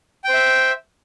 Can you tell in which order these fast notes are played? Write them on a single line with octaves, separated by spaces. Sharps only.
G5 C5 E5